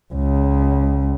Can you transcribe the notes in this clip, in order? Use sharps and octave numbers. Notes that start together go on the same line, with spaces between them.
C#2